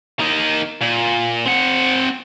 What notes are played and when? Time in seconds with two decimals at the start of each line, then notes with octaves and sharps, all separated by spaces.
0.19 A#3 D#4
0.81 A#2
1.45 C4 F#5